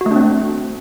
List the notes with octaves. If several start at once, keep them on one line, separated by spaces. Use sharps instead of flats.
F#4
A3
D4
C4